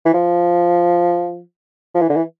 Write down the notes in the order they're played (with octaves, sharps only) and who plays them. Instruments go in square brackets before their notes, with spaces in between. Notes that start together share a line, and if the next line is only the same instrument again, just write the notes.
[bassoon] E3
F3
F3
E3
D3
E3